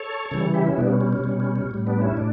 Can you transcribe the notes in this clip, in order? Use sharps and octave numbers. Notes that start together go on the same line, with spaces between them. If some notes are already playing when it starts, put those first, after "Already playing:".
Already playing: A4 C#5
C#3 E3 G3 A4 C#5
E4 G4
C#4 E4
B2 G3 B3 D4
C#4
C#4
C#4
B2 G3 C#4
C#4
C#4
A2 G3
B3 D4
C#4 E4
A2 D4